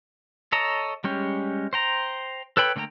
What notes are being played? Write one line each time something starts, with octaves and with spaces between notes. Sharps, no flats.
A4 C#5 D#5 A5 A#5
G3 G#3 C#4 G4
C5 G5 A#5
A4 B4 C#5 G5 B5
D3 A3 A#3 G5 A#5